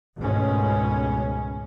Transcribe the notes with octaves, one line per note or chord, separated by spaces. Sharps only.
G#1 C#2 B2 G#3 A3 C#4